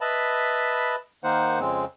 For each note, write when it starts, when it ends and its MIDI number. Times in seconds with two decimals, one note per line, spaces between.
0.01 0.96 71
0.01 0.96 75
0.01 0.96 76
0.01 0.96 81
0.01 0.96 83
1.24 1.60 51
1.24 1.60 58
1.24 1.60 63
1.24 1.60 72
1.24 1.60 78
1.60 1.85 41
1.60 1.85 49
1.60 1.85 56
1.60 1.85 60